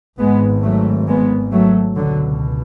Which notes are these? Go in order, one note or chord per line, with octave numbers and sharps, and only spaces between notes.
G#1 G#2 G#3 B3
F#3 A3
G#3 B3
F#3 A3
C#2 B2 D3 F#3